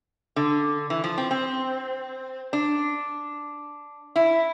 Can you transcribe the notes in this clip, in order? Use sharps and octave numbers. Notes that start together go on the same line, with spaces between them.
D3
E3
F3
C4
C4
D4
E4